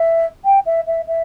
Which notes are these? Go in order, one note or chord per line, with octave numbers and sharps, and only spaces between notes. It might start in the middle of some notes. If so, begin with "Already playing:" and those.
Already playing: E5
G5
E5
E5
E5